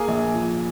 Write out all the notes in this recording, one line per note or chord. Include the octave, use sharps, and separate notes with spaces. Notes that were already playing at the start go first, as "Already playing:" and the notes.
Already playing: A#3 G#4 G#5
A#1
F3